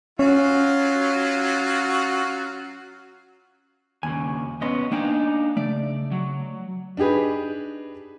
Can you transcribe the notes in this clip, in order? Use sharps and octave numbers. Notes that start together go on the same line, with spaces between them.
F#3 C#4 F4 F#4
D#2 C#3 G#5
B1 B3 C#4 D#5 C6
A#3 D4 D#4 G5 G#5
C#3 A3 D5
F#3
D4 D#4 G4 G#4 B4